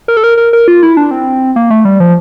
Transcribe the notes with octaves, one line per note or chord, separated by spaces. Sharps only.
A#4
A4
A#4
A#4
A#4
F4
E4
D4
C4
A#3
A3
G3
F3